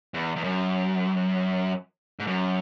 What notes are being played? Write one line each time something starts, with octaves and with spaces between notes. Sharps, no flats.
E2
E2
F#2
G#2
F#2